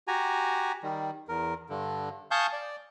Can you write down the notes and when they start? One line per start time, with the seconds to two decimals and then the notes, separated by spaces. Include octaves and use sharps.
0.08 F#4 G4 G#5 A#5
0.83 D#3 G3
1.29 E2 A#4
1.70 G2 D3
2.31 F5 G#5 A5 C#6 D#6 G6
2.53 D5